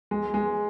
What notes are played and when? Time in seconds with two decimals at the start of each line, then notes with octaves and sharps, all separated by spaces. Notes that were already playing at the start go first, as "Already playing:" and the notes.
0.11 G#3
0.34 G#3